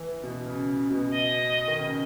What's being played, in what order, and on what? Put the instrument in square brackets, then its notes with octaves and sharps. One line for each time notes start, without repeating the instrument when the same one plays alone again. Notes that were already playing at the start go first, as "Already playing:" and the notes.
Already playing: [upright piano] E3
B2
C#3
C#3
B2
[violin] D#5
[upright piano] D#3
C#3